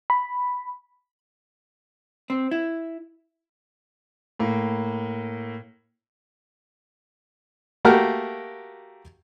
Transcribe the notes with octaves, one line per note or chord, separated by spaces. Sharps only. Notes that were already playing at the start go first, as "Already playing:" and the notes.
B5
C4
E4
A2 A#3
A3 A#3 F#4 G4 A#4 F6